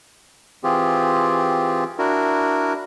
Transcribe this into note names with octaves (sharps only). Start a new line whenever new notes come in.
E3 C4 F4 G4 G#4
D4 E4 F#4 A#4